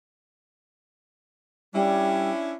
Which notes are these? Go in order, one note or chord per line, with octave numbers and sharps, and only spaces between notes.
G3 C#4 D4 E4